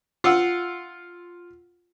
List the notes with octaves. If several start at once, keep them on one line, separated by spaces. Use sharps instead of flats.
F4 F#5 E6